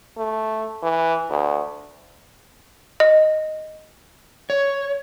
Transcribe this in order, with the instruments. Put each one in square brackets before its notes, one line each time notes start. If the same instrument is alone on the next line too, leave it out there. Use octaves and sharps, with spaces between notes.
[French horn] A3
E3
D2
[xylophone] D#5
[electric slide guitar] C#5